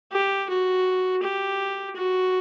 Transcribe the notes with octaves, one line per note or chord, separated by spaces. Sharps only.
G4
F#4
G4
F#4